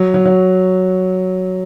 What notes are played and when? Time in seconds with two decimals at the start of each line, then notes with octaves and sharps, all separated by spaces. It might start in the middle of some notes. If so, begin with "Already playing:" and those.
Already playing: F#3
0.14 F#3
0.25 F#3